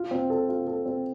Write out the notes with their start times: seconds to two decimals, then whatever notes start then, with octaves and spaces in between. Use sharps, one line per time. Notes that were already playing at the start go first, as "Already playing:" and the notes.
Already playing: F4
0.11 C4
0.30 A4
0.49 F4
0.67 A4
0.86 C4